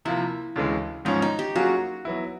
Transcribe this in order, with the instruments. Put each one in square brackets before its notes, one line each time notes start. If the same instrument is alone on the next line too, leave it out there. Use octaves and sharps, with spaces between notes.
[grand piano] C3 F3 A#3 [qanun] E4
[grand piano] D2 C#3 E3 G#3
[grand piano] G#2 F3 G#3 C#4 [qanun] D#4
[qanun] D#4
G4
[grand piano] F#3 A#3 C#4 F4 G#4 [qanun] F#4
[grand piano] F#3 B3 E4